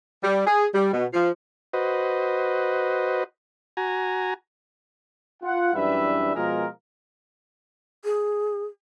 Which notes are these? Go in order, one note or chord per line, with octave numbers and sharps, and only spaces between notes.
G3
G#4
G3
B2
F3
F#4 B4 C5 D#5
F#4 G#5 A#5
F4 F#5
F#2 E3 G3 D4 B4 E5
B2 F3 G#3 F4 G#4 A#4
G#4